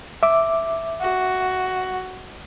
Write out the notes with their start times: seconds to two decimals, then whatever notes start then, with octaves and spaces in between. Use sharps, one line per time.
0.23 E5 D6
1.02 F#4